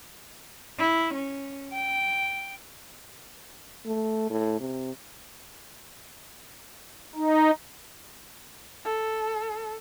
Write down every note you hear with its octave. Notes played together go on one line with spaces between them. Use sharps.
E4
C#4
G5
A3
A2
C3
D#4
A4